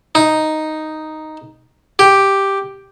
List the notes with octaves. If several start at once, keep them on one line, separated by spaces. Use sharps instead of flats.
D#4
G4